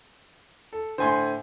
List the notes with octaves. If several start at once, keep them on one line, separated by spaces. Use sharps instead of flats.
A4
A2 D3 C5 G#5 C6